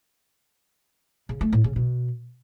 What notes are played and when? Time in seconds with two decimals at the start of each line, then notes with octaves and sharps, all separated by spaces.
1.29 C#3
1.41 A3
1.53 A2
1.64 C#3
1.76 B2